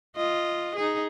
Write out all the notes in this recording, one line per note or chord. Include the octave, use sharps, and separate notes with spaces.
F4 D#5
D#4 G#4